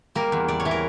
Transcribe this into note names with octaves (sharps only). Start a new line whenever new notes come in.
G3 A#3 A#4
E2
E2 D5
C#5
E3
A#4